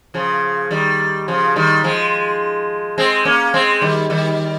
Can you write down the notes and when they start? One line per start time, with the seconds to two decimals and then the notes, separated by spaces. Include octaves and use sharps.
0.14 C#3 F3
0.71 D#3 G3
1.28 C#3 F3
1.56 D#3 G3
1.84 F3 G#3
2.98 G#3 C4
3.25 A#3 C#4
3.54 G#3 C4
3.81 D#3 G3
4.10 D#3 G3